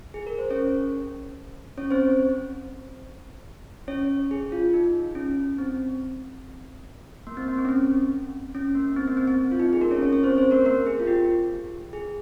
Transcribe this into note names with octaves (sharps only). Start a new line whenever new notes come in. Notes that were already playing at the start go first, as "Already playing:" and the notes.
G#4
A#4
C5
C#4 C#5
C#4 C#5
C4 C5
C#4 C#5
G#4
F4
D#4
C#4
C4
A#3
C4
A#3
C4
C#4
C4
C#4
A#3
C4
A#3
C4
C4
C4
F4
D#4
G#4
A#3 A#4
C#4 C#5
C#4 C#5
C#4 C#5
C4 C5
C4 C5
A#3 A#4
A#3 A#4
G#4
F4
G4
G#4